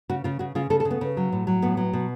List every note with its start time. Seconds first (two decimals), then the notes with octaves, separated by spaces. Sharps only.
0.09 C#3 F#4
0.24 C#3 F4
0.39 C#3 F#4
0.55 C#3 F4
0.70 C#3 A4
0.80 A4
0.85 C#3
0.91 B3
1.01 C#3
1.17 F#3
1.32 A2
1.47 F#3
1.62 A2 B3
1.77 F#3
1.93 B2